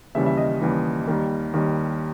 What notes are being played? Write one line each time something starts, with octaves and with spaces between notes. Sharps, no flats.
D#2 C#3 E3 G3 E5
E5
D#5
D#2 C#3 E3 G3
D#2 D#3 G3 A#4
D#2 D#3 G3 A#4